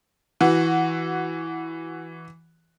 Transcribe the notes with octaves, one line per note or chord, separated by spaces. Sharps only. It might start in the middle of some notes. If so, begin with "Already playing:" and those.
E3 F#4